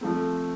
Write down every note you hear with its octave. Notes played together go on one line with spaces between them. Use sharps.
F3 A3 C4